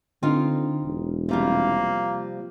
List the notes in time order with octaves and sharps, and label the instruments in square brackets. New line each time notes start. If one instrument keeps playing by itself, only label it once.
[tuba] D3 [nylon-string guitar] C4 D#4 F4
[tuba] E1
[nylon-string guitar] C3 F3 G3 [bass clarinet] A#3